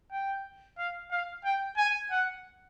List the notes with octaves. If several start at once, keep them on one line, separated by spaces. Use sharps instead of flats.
G5
F5
F5
G5
G#5
F#5